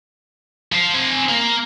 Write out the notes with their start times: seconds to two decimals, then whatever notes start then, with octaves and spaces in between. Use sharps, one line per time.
0.72 F3 C5
0.94 C4 G#5
1.29 A#3